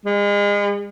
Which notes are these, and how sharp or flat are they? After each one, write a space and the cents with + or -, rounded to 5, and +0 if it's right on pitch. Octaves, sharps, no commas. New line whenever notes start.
G#3 -35